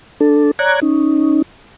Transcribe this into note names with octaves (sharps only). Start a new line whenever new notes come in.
D4 A4
C#5 D5 A#5 F#6 G#6
C#4 D#4